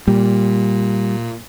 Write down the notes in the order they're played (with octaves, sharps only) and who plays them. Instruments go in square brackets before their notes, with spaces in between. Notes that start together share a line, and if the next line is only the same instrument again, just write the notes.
[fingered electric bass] A#2 [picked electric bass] G3